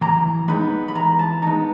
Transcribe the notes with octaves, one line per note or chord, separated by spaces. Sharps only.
E3 A#5
G#3 B3 D#4 B5
B5
E3 A#5
A5
G#3 B3 D#4 A#5